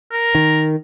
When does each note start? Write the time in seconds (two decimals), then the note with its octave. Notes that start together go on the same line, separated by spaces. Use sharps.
0.12 A#4
0.35 D#3